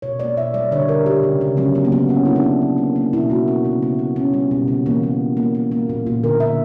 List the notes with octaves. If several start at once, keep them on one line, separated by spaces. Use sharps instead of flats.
B2 C#5
A#3 D5
B2 E5
G3 D5
D3 C#5
D3 A#4
C#3 G4
C#3
C#3
F#3 C#4
C#3 B3
A#3
F#3 B3
A#3 C#4
A#3 E4
D4
A#3
A#3
A#3
A#3
B2 E4
A#3 F#4
B2 B3
C#3 B3
A#3 B3
C#3 B3
B2 C#4
G3 B3
B2 B3
C#3 B3
E3 A#3
A#3 B3
C#3
A#3
A#3
A#3
A#2
A#2
D3 A#4
D3 E5